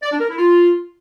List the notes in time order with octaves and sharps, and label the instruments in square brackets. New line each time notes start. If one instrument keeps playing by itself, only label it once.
[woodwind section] D5
D4
A#4
E4
F4